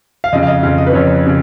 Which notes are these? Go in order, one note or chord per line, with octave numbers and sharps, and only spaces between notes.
F5
F2 C#3 D#5
F5
D#5
F2 C#3 F5
D#5
B4
F2 C#3 C#5
C#3